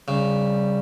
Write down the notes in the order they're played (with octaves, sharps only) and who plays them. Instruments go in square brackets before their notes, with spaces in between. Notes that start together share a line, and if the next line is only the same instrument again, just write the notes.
[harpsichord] C#3 [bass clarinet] G3